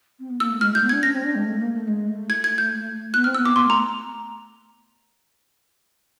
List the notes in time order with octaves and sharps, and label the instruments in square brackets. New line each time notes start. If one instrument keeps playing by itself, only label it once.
[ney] C4
B3
[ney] A#3 [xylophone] E6
[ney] A3
[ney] G#3 [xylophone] F6
[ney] A3 [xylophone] G6
[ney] B3
[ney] D4 [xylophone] G#6
[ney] C#4 [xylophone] A#6
[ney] C4
D4
G#3
A3
A#3
A3
G#3
A3
[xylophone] G#6
G#6
G6
[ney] B3 [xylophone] F#6
[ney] C4 [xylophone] F6
[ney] B3 [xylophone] E6
[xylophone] D6
[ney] B3 [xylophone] C6
[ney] A3
[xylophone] A#5